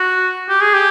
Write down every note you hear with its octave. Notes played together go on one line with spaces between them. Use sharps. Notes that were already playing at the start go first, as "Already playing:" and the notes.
Already playing: F#4
G4
G#4
G4